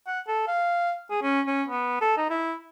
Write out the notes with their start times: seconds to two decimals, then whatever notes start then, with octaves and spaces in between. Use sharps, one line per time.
0.07 F#5
0.27 A4
0.47 F5
1.10 G#4
1.23 C#4
1.47 C#4
1.68 B3
2.01 A4
2.17 D#4
2.30 E4